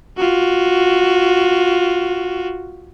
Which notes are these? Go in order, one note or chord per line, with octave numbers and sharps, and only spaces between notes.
F4 F#4